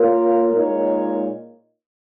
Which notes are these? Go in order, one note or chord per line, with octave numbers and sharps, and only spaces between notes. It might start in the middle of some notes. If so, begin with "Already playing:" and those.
Already playing: A#3 F4 A#4 C#5
A#2 G#3 D#4 A#4 C#5